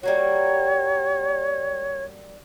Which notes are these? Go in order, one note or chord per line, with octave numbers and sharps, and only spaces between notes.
G3 A#3 F#4 C#5